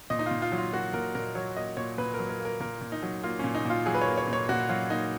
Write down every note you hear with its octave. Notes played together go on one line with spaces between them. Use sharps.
A#2 D#5
D#4
A#2 F4
F4
F#3
F4
A#3 F#4
A#2 A#4
A#2 A#4
F#3 C#5
A#3 D#5
A#2 C#5
A#2 B4
F#3 A#4
A#4
A#3
A#4
A#2 A#4
A#2
D#4
F#3
A#3 F4
A#2 C#4
D#4
A#2 F4
F#3 G#4
B4
A#3 C#5
C#5
A#2
C#5
A#2 F#4
F#3 F4
A#3 D#4